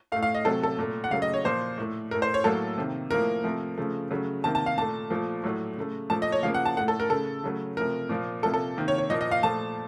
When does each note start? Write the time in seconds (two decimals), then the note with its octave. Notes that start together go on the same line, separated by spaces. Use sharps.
0.12 A3 F5
0.16 A2
0.23 F5
0.35 D#5
0.45 C3 F#3 A3 A4
0.63 A4
0.78 A#2 A3
1.04 F#5
1.11 C#3 F#3 A3 F5
1.22 D#5
1.34 C#5
1.45 A#2 F3 A#3 C5
1.78 A2 A3
2.11 A2 A3 A#4
2.22 C5
2.34 C#5
2.44 A2 F#3 A#3 A4
2.78 C3 D#3 A#3
3.11 A2 F3 A#3 A#4
3.44 C3 F3 A3
3.78 C#3 F3 A3
4.11 C#3 F#3 A3
4.44 C3 D#3 A#3 A5
4.55 A5
4.66 F5
4.77 A#2 A3 A5
5.10 A#2 F3 A3
5.43 A2 F#3 A3
5.78 C#3 A3
6.10 A#2 F3 A3 A5
6.22 D#5
6.32 C#5
6.43 C#3 F3 A#3 F5
6.54 F#5
6.65 A5
6.77 A2 A3 F#5
6.88 A4
7.00 A#4
7.10 C#3 A3 A4
7.44 C#3 F#3 A3
7.77 C3 F3 A3 A#4
8.09 A#2 F3 A#3
8.43 C3 F3 A#3 A4
8.54 A4
8.77 C3 D#3 A#3
8.88 C#5
8.98 C#5
9.10 A#2 F3 A#3 D#5
9.21 D#5
9.31 F5
9.43 A#2 F3 A3 A5